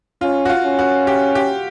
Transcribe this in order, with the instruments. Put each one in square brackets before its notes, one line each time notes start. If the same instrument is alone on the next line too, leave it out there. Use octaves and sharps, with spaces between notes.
[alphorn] C#4 [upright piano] F4
[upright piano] F#4
F4
[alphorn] C#4
[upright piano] F#4
G4
G4